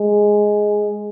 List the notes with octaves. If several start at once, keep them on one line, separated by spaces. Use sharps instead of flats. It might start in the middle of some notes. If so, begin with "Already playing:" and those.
Already playing: G#3